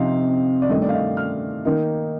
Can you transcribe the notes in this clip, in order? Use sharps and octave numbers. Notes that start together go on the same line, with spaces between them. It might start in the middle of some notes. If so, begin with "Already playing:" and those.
Already playing: C3 F3 C4 D#4 F5
D5
G2 D#3 A3 D#5
D5
F5
D#5
F6
D#3 A#3 D#4